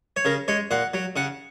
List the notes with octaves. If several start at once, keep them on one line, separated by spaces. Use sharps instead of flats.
C#5
C#3 A#4
G#3 C#5
A#2 F#5
F#3
C#3 F#5